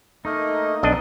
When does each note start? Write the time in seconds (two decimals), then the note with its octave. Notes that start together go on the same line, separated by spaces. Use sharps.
0.25 A3 A#3 D#4 D#5
0.83 B1 D4 D#5